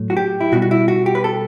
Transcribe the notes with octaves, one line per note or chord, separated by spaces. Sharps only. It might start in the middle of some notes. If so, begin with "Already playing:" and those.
Already playing: A2 F#3 A3
F#4
G4
E4
B2 G3 F#4
F#4
E4
F#4
G4
B4
A4